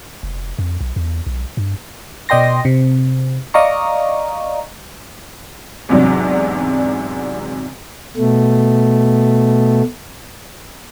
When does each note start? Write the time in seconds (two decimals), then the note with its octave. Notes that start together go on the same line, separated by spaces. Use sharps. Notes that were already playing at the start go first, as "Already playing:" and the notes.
0.23 F1
0.59 F2
0.81 B1
0.96 E2
1.27 B1
1.57 G2
2.29 B2 D5 D#5 G5 C6 A#6
2.65 C3
3.54 D5 D#5 F5 A#5 C#6
5.89 E2 G#2 C3 F#3 D4
8.17 B2 A3